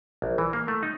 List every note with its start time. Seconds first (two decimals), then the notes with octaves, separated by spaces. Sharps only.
0.22 A#1
0.38 E3
0.53 A#3
0.68 A3
0.83 D#4